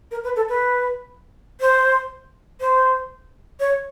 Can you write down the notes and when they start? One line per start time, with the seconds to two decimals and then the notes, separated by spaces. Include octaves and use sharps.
0.11 A#4
0.24 B4
0.36 A4
0.49 B4
1.61 C5
2.60 C5
3.60 C#5